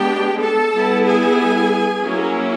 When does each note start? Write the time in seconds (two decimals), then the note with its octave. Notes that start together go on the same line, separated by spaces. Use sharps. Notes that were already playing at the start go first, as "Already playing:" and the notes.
Already playing: G#3 B3 D4 G4 G5
0.40 A4 A5
0.72 G3 B3 E4
1.05 G#4 G#5
2.02 F#3 A#3 C#4 E4